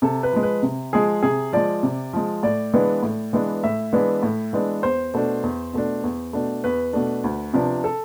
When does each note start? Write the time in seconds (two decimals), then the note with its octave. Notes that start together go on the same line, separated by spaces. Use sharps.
0.02 C3 A4
0.23 B4
0.33 F3 G#3
0.43 B4
0.63 C3
0.93 F3 G#3 G#4
1.23 C3 G#4
1.53 F3 G#3 D5
1.83 C3
2.13 F3 G#3
2.43 A2 D5
2.74 E3 G#3 B3 D4
3.03 A2
3.33 E3 G#3 B3 D4
3.64 A2 E5
3.93 E3 G#3 B3 D4
4.23 A2
4.53 E3 G#3 B3 D4
4.83 E2 C5
5.14 B2 A3 D4
5.43 E2
5.73 B2 A3 D4
6.04 E2
6.33 B2 A3 D4
6.64 E2 B4
6.93 B2 A3 D4
7.24 D2
7.53 C3 F3 B3 D4
7.84 A4